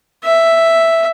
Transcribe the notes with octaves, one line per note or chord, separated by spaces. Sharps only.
E5